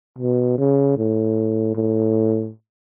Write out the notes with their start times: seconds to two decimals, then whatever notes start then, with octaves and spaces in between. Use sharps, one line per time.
0.18 B2
0.58 C#3
0.98 A2
1.75 A2